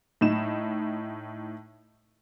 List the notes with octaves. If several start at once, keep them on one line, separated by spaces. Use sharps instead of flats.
A2 D#4 E7